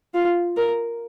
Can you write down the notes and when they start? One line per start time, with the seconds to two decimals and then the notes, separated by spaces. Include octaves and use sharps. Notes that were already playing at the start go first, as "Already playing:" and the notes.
0.14 F4
0.57 A#4